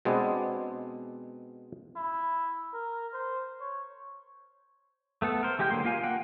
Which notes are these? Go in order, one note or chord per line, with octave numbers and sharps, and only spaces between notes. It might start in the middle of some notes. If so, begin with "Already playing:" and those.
B2 G#3 B3 C4 D4 G#4
E4
A#4
C5
C#5
A3 B3 A4
A#4 C5
E3 G#3 G4 G5 G6
D3 F#3 A#3 C6
A#3 F4 F5 G#5
A#3 F#5 G5